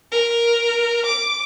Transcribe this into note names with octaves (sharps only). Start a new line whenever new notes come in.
A#4
D6